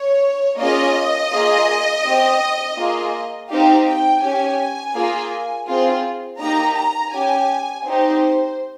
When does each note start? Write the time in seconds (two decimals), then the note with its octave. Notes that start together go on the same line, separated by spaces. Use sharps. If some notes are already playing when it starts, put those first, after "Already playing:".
Already playing: C#5
0.60 A#3 C#4 F4 G#4 D#5
1.32 A#3 F4 G#4
2.04 C4 G4
2.78 A#3 F4 G#4
3.49 C4 D#4 G4 F5
3.87 G5
4.22 C#4 G4 G#5
4.95 A#3 F4 G#4
5.68 C4 F4 G#4
6.40 A#3 D#4 G4 A#5
6.75 A#5
7.12 C#4 G4 G#5
7.85 C4 D#4 G4 C5